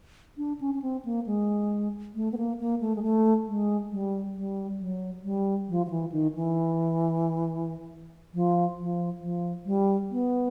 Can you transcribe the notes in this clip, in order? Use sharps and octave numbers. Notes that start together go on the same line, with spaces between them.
D4
C#4
C#4
C4
A#3
G#3
A3
B3
A#3
A#3
A3
G#3
A3
G#3
G3
G3
F#3
G3
F3
F3
E3
D#3
E3
F3
F3
F3
G3
B3